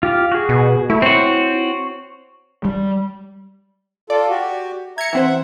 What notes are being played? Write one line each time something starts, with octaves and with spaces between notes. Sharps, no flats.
F4 G4 F5
F#4 G#4
B2
A3 E4
C4 F#4 C5 C#5
G3
F4 A4 D5
F#4 G4
E5 A#5 G#6 C#7
E3 C4 C5 E5 F#5